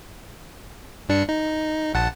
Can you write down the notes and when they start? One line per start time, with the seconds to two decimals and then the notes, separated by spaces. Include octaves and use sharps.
1.09 G2 D4 C#7
1.29 D#4
1.94 A#1 F#5 A5